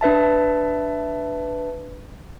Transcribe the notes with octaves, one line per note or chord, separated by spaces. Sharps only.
D4 B4 E5 A5